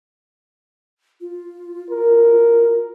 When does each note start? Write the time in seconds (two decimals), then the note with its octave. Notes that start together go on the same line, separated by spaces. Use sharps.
1.21 F4
1.91 A#4